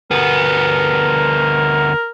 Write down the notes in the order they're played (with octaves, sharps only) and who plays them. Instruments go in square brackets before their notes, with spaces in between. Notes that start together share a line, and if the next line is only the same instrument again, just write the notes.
[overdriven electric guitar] D2 B3 [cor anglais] A#4